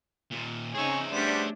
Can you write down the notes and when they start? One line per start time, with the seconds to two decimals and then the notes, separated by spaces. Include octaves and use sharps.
0.31 D#2 A#2
0.74 C#3 C4 D#4 G#4 C#5 E5 G#5
1.11 G3 A3 B3 C#4 D4 C5